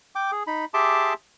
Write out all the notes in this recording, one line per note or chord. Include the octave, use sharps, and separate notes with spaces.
G5 D6
G#4
D#4 B5
G4 G#4 E5 A5 C6 D6